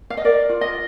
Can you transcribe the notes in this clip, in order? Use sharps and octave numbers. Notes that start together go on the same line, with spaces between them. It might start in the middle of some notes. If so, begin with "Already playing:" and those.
F5
D#5
A#4 D5
F4
D#5